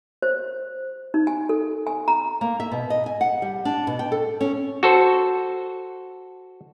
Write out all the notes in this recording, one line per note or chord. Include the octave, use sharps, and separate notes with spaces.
C5
D#4
G#5
A4
G#5
A#5
A#3
E5
B2
D#5
G#5
F#5
G3
D4
B2
G5
A4
C#4
F#4 A4 C5